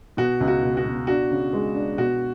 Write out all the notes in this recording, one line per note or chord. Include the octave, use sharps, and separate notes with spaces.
B2 F#4
C#2
F#4
B2
F#4
B2
D4 F#4
C#3
G#3
D4
B2 F#4